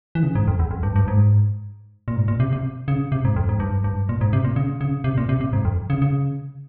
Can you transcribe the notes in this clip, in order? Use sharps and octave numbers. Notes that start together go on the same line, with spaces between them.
E3
C#3
G#2
F2
E2
F2
G2
G2
G#2
A#2
G#2
A#2
C3
C3
C#3
C3
G#2
F2
G#2
G2
G2
A#2
G#2
C3
A#2
C#3
C#3
C3
A#2
C3
C3
G#2
F2
C#3
C#3